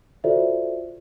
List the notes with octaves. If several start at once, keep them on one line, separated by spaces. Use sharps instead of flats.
F4 F#4 A4 C5 D5 E5